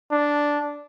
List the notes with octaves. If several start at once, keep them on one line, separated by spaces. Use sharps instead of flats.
D4